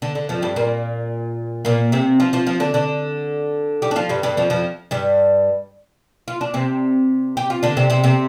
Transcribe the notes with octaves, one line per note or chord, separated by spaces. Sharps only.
D3
D3
F2 F3
G2 G3
A#2 A#3
A#2 A#3
C3 C4
F3 F4
F3 F4
F3 F4
D3 D4
D3 D4
G3 G4
D4
F3 F4
G2 G3
G2 G3
F2 F3
F2 F3
G2 G3
F4
D4
C3 C4
G4
F4
D3 D4
C3 C4
C3 C4
C3 C4